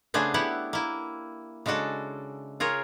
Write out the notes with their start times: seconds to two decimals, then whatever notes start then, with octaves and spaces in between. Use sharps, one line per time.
0.14 C#3 A3 B3 D4 G#4 C5
0.34 B3 E4 G4 F#5
0.73 A#3 E4
1.66 C#3 G#3 D4 F#4 A4
2.60 F4 G#4 A#4 C#5